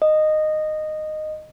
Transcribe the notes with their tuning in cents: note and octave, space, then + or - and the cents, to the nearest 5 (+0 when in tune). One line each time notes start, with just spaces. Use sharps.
D#5 -10